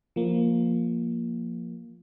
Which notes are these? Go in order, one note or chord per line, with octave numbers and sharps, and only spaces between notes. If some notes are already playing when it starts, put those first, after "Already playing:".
F3 A#3